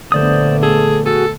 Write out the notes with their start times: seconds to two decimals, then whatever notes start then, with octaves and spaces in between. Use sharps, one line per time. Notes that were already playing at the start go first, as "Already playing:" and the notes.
0.12 A#1 D3 A3 B3 C5 D5 D#6
0.63 G#4 A4
1.06 F#4 G#4 A4